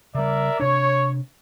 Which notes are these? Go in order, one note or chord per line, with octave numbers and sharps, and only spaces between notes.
C#3 G3 A#4 D5 E5
C3 D4 C#5